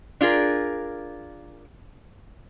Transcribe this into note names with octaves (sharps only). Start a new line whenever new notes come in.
D4 F4 G#4 A#4